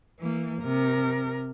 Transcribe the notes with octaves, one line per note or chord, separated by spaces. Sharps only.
E3 A#3
C3 A#4